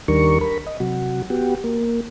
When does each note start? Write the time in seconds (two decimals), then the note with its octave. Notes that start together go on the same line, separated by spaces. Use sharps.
0.08 D#2 D#3 G3 D4 A#4 C#6
0.41 A#4 B5
0.67 D#5
0.80 C3 F#3 F#4
1.30 B3 F#4 G4
1.64 A#3